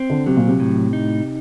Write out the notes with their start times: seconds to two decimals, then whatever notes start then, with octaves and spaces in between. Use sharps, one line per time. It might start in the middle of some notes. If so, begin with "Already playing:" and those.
Already playing: C4
0.10 D3
0.26 C3 F#3
0.36 A#2
0.47 C3
0.60 A2
0.93 D#4